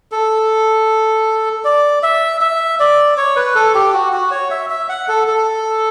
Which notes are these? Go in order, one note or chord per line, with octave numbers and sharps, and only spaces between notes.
A4
D5
E5
E5
D5
C#5
B4
A4
G4
F#4
F#4
C#5
E5
E5
F#5
A4
A4